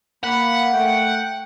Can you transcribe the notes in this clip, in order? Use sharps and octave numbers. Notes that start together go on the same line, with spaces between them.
A#3 F#5 B5
A3 G5